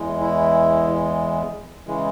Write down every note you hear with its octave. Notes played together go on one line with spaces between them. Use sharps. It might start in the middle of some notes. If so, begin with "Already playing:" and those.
Already playing: E2 E3 G#3
E4
C#3 E3 G#3